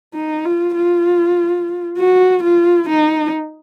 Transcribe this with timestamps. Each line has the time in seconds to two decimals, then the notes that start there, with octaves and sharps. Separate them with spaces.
0.14 D#4
0.45 F4
0.75 F4
1.98 F#4
2.44 F4
2.89 D#4